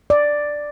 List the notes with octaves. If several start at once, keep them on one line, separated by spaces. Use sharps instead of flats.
D5